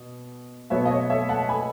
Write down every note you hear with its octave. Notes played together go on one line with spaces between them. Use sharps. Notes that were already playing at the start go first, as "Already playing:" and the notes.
Already playing: B2
B2 F#3 B3 C#5 E5
D#5
C#5
C#5 E5
F#5 A5
G#5 B5